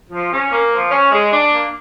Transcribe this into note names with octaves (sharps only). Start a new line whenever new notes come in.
F3
C#4
A#3
F3
C#4
G#3
D4
A#3